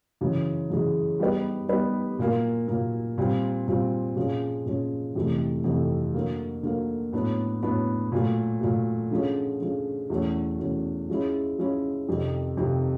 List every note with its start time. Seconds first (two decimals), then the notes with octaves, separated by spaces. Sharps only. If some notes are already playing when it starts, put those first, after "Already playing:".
0.21 F#2 C#3 E3 G#3
0.70 F#2 C#3 E3 G#3
1.20 G3 B3 D#4 G4 B4
1.69 G3 B3 D#4 G4 B4
2.19 A#2 F#3 A#3
2.68 A#2 F#3 A#3
3.18 A#2 G3 C4 F4
3.68 A#2 G3 C4 F4
4.16 A#2 F3 G#3 C#4
4.66 A#2 F3 G#3 C#4
5.15 F2 C3 E3 A3
5.64 F2 C3 E3 A3
6.14 D3 F#3 A#3
6.63 D3 F#3 A#3
7.13 A2 F#3 B3 D4
7.63 A2 F#3 B3 D4
8.12 A#2 F#3 A3
8.61 A#2 F#3 A3
9.11 D3 F3 G#3 C#4
9.60 D3 F3 G#3 C#4
10.10 E2 B2 F#3 A3 C#4
10.59 E2 B2 F#3 A3 C#4
11.09 F3 G#3 C#4 E4
11.58 F3 G#3 C#4 E4
12.08 F2 C3 D#3
12.57 F2 C3 D#3